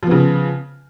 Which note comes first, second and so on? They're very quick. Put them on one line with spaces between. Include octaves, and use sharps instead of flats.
F3 B3 C#3